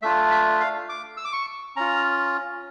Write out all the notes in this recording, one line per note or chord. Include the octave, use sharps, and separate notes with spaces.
A3 D4 F4 E5
E5
F5
D6
E6
D6
C#6
C#4 F4 A#5